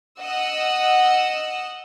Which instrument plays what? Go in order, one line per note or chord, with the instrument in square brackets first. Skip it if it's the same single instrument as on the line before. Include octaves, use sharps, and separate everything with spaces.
[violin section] D#5 F#5 E6